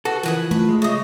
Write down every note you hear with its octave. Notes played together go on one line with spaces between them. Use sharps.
F#4 A4 B4
E3 F3 G#4 A#4 B4 F#5
A3 F4 B4
G#3
C#3 D#5 E5